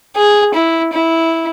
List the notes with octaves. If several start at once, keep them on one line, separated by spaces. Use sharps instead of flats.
G#4
E4
E4